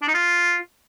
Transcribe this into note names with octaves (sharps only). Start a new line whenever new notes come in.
D4
D#4
F4